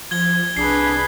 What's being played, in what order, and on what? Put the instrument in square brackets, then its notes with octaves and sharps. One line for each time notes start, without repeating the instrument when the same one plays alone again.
[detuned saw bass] F3 [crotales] G#6 G7
[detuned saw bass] C2 [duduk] D4 [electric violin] G#4 B4 [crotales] C7